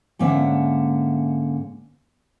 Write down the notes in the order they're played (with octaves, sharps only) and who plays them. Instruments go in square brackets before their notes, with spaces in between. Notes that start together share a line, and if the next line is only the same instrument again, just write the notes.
[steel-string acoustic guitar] G#2 D3 A#3 C#4 E5 F#5